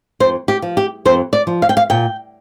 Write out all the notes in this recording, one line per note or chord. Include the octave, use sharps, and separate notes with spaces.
F2 C5
G4
F3
G4
F2 C5
D5
F3
F5
G5
F5
A#2 G5